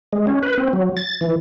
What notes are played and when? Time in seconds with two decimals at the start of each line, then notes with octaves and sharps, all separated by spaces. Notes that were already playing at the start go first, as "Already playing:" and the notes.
0.13 G#3
0.27 C#4
0.43 B4
0.58 C4
0.73 F#3
0.97 A6
1.21 E3